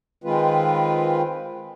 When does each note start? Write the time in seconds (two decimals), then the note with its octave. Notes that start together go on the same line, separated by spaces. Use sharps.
0.24 D#3 G#3 C4 F4 B4